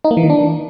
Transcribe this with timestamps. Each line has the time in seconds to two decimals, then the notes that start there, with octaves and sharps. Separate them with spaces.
0.04 D#4
0.11 A#3
0.17 E3
0.23 D#3
0.30 D4